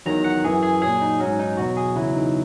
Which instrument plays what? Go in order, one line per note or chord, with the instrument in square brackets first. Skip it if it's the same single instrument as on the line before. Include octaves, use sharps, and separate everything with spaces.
[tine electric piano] E2 D#3 F#3 A#5
F#5
F#2 E3 G#4
G#4
A#2 F#3 G#4
D#4
G#2 F#3 C#4
D#4
E2 B2 F#3 F#4
G#4
E2 C#3 F#3 E4
D#4